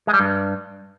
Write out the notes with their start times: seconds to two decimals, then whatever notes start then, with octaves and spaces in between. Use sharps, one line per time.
0.07 G#3
0.14 G3
0.20 G2